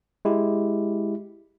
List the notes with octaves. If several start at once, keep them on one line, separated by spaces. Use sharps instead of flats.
G#3 E4 G4